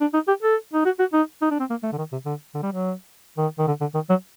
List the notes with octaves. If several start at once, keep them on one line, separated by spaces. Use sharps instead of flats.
D4
D#4
G4
A4
D#4
F#4
F#4
D#4
D#4
D4
C4
A#3
A3
D3
D#3
C3
D3
D3
G3
F#3
D#3
D#3
D3
D3
D#3
F#3